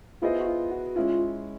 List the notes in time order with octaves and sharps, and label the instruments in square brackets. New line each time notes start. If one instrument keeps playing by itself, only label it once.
[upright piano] B3 E4 G#4 C5 D#5 [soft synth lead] F4
[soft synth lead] F#4
F4
F#4
[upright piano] G#3 C#4 E4 [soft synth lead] F4